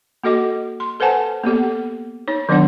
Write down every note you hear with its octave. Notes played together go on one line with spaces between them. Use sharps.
A#3 F#4 A4 D#5 D6
C6
A4 B4 C5 F#5 G#5 A5
A#3 B3 G4 A4
D#4 C#5
D#3 F#3 B3 D4 C#5 F#5